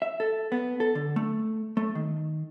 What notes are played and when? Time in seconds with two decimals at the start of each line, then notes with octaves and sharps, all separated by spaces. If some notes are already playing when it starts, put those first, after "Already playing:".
0.02 E5
0.20 A4
0.52 B3
0.80 A4
0.95 D3
1.16 A3
1.77 A3
1.95 D#3